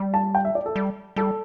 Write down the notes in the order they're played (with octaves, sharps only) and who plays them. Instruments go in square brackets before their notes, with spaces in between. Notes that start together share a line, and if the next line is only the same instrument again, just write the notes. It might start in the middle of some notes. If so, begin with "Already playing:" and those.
Already playing: [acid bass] G3
[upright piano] A5
G5
E5
D5
A4
[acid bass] G3
[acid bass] G3 [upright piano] A4